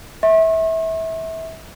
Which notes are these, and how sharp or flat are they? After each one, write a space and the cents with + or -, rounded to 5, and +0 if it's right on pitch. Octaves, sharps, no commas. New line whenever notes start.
E5 -25 C#6 -45